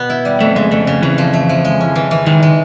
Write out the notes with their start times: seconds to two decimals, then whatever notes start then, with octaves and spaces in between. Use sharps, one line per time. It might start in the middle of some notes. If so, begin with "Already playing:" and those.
Already playing: B2 B3
0.10 E4
0.25 G3
0.40 F2 A3
0.56 C#3 G#3
0.71 F2 A3
0.87 C#3
1.02 F2 E3
1.18 F3
1.33 A3
1.49 F3
1.65 G#3
1.80 C#4
1.96 E3
2.11 E3
2.26 D#3 G#3
2.43 G#3